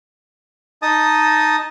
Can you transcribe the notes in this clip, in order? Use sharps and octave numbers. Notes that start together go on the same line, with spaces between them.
D#4 D#5 A5 D#6